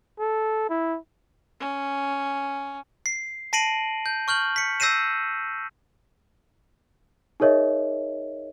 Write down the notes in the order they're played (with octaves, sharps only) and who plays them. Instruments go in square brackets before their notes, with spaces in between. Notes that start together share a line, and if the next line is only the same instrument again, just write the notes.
[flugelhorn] A4
E4
[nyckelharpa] C#4
[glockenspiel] C7
A5 A#6 C7 D7 D#7 F#7
G6
C#6 F6 G6 F#7
B6 C#7
E6 G6 A#6 C7 D#7 E7
[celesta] D#4 G#4 A#4 C#5 D#5 E5